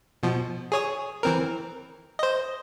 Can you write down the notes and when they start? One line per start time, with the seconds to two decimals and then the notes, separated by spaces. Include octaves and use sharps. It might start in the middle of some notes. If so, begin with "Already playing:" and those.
0.23 B2 F3
0.72 G#4 C#5 D#6
1.23 E3 C4 A#4
2.19 C5 D#5